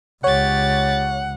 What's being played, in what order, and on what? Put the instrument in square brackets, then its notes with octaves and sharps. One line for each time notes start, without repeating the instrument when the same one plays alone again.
[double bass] C#2 [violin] G4 A6 [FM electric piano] C#5 [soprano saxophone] F#5